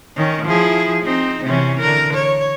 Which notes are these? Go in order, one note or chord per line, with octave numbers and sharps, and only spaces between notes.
D#3 C#4
F3 E4 G#4
C4 D#4
C3 E3 C#4
D3 A#4
C#5